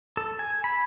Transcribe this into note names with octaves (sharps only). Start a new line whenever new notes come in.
A4
G#5
B5